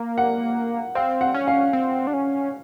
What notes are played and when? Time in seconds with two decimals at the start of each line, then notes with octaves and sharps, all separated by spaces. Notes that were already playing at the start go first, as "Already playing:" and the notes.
Already playing: A#3
0.18 F#5
0.95 C4 F5
1.21 F#5
1.34 C#4
1.48 F5
1.73 C4
2.07 D4
2.13 C#4